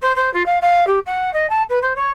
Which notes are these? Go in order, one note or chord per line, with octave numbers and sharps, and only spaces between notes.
C5
C5
F4
F5
F5
G4
F#5
D#5
A5
B4
C5
C#5